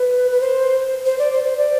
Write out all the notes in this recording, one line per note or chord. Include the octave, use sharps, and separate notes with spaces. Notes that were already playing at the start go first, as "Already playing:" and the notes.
Already playing: B4
B4
C5
C5
D5
C5
C5
D5